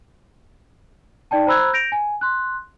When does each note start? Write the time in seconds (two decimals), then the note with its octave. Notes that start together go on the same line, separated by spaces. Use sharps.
1.31 D#4 D5 G5 A5
1.47 C5 A#5 B5 E6 F#6 G#6
1.73 G6 A#6 D7 F7
1.92 G#5
2.21 C6 F#6